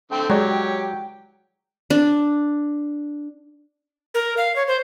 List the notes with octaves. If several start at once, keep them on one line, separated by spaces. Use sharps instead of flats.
D3 A3 C4 G5
F#3 G#3 G4 C#5 D5
D4
A#4
F5
C#5
C5